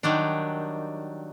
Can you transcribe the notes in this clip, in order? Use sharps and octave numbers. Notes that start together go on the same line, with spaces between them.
D#3 F#3 G3 D4